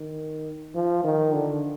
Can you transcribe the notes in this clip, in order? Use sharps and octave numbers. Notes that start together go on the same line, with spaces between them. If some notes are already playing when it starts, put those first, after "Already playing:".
Already playing: D#3
F3
D#3
D3